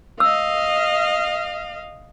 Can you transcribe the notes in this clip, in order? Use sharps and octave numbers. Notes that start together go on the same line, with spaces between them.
D#5 F5 E6